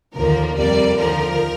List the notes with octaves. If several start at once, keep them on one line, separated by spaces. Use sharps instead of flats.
D#2 D3 F3 A#3 A#4
F2 C3 G3 A#3 D5
D#2 D3 F3 A#4